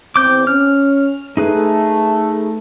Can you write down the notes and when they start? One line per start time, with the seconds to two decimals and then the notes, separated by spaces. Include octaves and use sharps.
0.16 E2 C4 D6 G6
0.47 C#4 F6
1.37 A3 D#4 G#4 B4